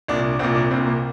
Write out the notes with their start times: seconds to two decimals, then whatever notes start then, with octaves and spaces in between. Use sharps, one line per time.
0.08 C2 A#2 D4
0.39 C2 A#2 C4
0.55 D4
0.71 C2 C4
0.74 A#2
0.86 A#3